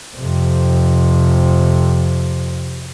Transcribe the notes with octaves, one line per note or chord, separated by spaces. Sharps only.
F2 C3